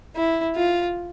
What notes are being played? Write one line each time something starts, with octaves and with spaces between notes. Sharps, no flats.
E4
F4